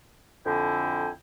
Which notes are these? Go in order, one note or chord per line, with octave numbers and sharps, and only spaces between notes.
F2 D3 E4 G5 G#5